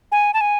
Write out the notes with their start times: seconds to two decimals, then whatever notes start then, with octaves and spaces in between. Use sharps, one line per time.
0.12 G#5
0.34 A5
0.41 G#5